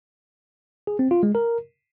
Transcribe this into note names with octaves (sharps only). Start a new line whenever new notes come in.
G#4
C4
F4
G#3
A#4